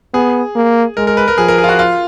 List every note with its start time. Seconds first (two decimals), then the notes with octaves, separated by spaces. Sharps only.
0.14 B3 G#4
0.55 A#3
0.97 G#3 A#4
1.07 A#4
1.17 B4
1.28 A#4
1.38 F3 G#4
1.48 A#4
1.58 G#4
1.64 F4
1.69 F#4
1.79 F4